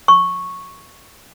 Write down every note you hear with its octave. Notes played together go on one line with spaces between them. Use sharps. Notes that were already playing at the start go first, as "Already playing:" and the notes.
C#6